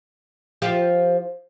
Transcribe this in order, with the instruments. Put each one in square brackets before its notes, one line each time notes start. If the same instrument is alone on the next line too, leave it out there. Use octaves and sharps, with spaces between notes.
[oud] F3 F4 G4